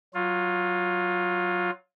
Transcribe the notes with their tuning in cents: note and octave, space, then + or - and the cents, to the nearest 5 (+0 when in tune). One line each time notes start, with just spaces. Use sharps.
F#3 +0 F4 +15